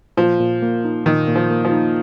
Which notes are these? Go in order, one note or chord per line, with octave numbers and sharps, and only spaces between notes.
A#2 F3
A#2
A#3
D#4
A#2 D#3
A#2
F3
A#3
F3
D#4